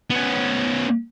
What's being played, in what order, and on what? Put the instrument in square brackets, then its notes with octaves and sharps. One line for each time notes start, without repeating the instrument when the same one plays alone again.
[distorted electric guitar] B3 C#4